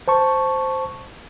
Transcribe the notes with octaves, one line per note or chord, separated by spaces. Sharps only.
C5 A5 C#6